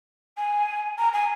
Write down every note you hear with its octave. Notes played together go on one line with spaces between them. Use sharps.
G#5
A#5
G#5